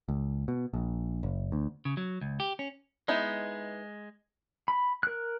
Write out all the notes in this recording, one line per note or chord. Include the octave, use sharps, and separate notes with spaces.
C#2
B2
A#1
F#1
D2
C#3
F#3
C#2
G4
C#4
G#3 B3 D#4 E4
B5
A#4 F#6